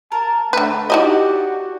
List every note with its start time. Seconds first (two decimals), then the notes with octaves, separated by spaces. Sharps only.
0.12 A#4 A5
0.53 D3 A3 B4
0.90 D#4 E4 F#4 G4 D5 D#5